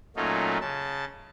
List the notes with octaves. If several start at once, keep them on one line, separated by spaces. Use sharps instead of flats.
A#2 F#3 A3 C#4 D#4 F4
C#3 A5